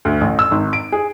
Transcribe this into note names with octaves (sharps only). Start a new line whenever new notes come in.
D2
A1
E6
G#1
D7
G#4